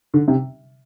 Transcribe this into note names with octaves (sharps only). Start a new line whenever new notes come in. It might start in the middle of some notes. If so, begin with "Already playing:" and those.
D3
C3